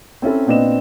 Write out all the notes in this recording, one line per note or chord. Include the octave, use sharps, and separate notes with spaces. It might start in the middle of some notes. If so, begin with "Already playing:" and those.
C4 C#4 E4 A4
A#2 B3 C4 D4 D#5 E7